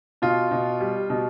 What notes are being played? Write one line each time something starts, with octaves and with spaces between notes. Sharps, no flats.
B2 F4
B2
G3
B2